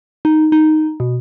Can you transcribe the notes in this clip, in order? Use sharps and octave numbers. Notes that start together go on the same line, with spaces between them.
D#4
D#4
B2